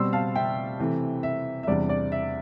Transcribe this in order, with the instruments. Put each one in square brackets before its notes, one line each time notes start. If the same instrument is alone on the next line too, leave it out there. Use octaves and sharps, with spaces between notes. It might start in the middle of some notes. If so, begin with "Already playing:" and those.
Already playing: [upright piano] B2 G3 C4 C6 E6
F5 A5
E5 G5
C3 E3 A3
E5
E5
E2 C3 G3 D4 D5
D5
E5